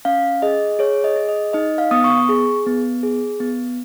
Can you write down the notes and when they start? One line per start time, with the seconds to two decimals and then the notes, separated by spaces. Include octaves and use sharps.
0.05 C#4 F5
0.42 G#4 D#5
0.79 G#4 C#5
1.04 D#5
1.16 G#4
1.29 D#5
1.53 D#4 D#5
1.78 F5
1.91 B3 D#6
2.04 C#6
2.29 G#4
2.66 B3
3.03 G#4
3.40 B3